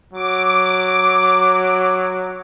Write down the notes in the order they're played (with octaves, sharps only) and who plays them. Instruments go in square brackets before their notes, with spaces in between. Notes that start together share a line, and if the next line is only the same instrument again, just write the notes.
[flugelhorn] F#3 [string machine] D6